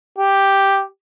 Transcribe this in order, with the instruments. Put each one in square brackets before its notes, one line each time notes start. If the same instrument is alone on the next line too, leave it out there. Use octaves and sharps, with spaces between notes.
[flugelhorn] G4